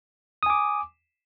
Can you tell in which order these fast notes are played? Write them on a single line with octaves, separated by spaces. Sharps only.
D#6 G#5 D6